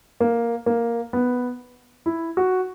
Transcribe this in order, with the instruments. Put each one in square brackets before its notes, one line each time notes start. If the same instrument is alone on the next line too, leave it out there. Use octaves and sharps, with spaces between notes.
[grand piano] A#3
A#3
B3
E4
F#4